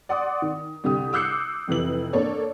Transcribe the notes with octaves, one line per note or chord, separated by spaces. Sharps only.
D5 F#5 C6 D6 D#6
D#3
C2 D3 G4 D#6
D6 E6 F#6 G6 C7 C#7
F1 F2 C3 E3 F#7
A#3 D4 A4 C#5 D5